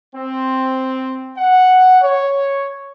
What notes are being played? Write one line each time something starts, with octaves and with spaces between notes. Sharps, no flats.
C4
F#5
C#5